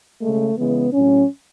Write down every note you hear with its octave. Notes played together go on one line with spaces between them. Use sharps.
C#3 G#3 A3
C#3 E3 G#3 B3
A2 F#3 C#4